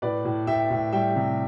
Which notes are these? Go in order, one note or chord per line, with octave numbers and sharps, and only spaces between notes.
A2 B4 D5
A2
A2 E5 G5
A2
G3 E5 G5
C3